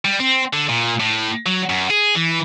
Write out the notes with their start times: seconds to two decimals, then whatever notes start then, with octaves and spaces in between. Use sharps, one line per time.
0.05 G3
0.20 C4
0.53 D3
0.69 A#2
1.00 A2
1.46 F#3
1.69 F#2
1.90 G#4
2.15 E3